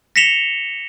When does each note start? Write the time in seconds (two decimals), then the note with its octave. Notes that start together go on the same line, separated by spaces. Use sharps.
0.16 A#6 B6 C#7 E7 F7 G7